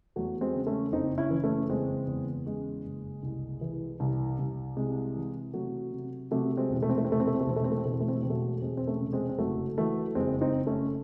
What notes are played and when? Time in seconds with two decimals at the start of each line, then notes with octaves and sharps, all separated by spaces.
0.16 E2 F#3 A3
0.41 G#3 C4
0.55 C#3
0.67 A3 C#4
0.92 F#1 C4 D#4
1.18 C#4 E4
1.30 E3
1.44 A3 C#4
1.69 F#1 G#3 C4
2.07 E2
2.46 C#3 G#3
2.85 F#1
3.23 C2
3.61 E3
4.00 C2
4.39 C2
4.77 C3 G#3
5.16 E3
5.54 C3 F#3 A3
5.92 C3
6.31 C3 F#3 A3
6.57 G#3 C4
6.70 E1
6.83 A3
6.89 C4
6.98 A3
7.05 C4
7.08 C3 A3
7.20 C4
7.27 A3
7.34 C4
7.41 A3
7.47 E1 C4
7.56 A3
7.64 C4
7.72 A3
7.78 C4
7.85 E1 A3
7.94 C4
8.00 A3
8.08 C4
8.15 A3
8.23 E1 C4
8.30 F#3 A3
8.62 E1 G#3 C4
8.77 C4
8.87 A3 C#4
9.00 C3
9.13 G#3 C4
9.29 C4
9.38 F#1 F#3 A3
9.78 E3 F#3 A3
10.15 F#1 G#3 C4
10.41 C4 D#4
10.55 F#1
10.67 A3 C#4